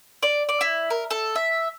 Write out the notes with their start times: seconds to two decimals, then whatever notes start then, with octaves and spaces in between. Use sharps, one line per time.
0.23 D5
0.49 D5
0.61 E4
0.90 A#4
1.11 A4
1.36 E5